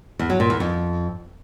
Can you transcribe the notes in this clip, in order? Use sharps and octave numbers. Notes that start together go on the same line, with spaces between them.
E2
F#3
A#2
E2
F2